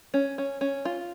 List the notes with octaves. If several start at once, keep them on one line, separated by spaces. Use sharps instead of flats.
C#4
C#4
C#4
F4